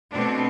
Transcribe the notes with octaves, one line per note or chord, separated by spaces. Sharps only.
B2 A3 C4 D4